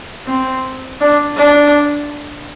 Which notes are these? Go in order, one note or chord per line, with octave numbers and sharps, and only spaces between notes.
C4
D4
D4